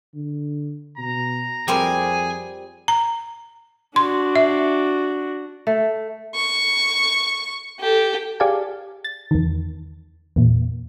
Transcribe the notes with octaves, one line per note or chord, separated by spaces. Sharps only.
D3
B2 A#5
F2 G3 C4 G#4 A#4 G#5
A#5
D4 F#4 C6
E5
A3
C#6
G4 A4
G4 G#4 D5 F5 G#5 A5
A6
E2 D#3
E2 A#2